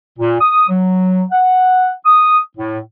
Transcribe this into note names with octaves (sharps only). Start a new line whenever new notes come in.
A#2
D#6
F#3
F#5
D#6
A2